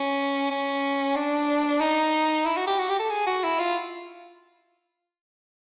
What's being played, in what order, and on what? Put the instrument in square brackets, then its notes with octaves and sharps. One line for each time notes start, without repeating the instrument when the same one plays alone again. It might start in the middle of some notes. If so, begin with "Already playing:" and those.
Already playing: [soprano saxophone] C#4
C#4
D4
D#4
E4
F#4
G4
F#4
G4
A4
G#4
F#4
E4
F4